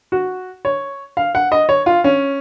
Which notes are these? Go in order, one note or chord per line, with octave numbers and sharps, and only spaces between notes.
F#4
C#5
F5
F#5
D#5
C#5
F4
C#4